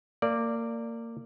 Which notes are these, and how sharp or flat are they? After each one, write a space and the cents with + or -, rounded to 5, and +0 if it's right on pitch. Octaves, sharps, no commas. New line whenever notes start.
A#3 -25 D5 +0